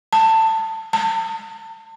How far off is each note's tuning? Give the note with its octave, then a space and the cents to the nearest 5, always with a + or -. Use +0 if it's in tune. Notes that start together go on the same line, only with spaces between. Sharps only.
A5 +20
A5 +35